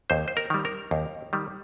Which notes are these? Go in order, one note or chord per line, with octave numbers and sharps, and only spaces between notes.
D#2 C5
C5
A#4
D#3 G3
A#4
D#2
D#3 G3